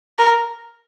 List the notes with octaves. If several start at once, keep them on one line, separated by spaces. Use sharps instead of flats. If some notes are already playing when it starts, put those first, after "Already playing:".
A#4